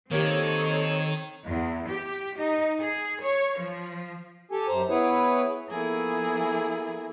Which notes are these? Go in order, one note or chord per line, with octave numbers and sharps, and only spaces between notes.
D#3 A#3 C4 D#4 G4 A4 C#5
E2
G4
D#4
G#4
C#5
F3
G4 A4 G#5
F#2 C5 A#5
B3 E4 G#4 B4 C#5
F3 A#3 B3 E4 G#4 A4